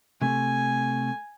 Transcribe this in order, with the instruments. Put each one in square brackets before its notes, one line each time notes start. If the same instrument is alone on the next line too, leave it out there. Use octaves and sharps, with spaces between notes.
[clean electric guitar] C3 A3 [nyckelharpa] G#5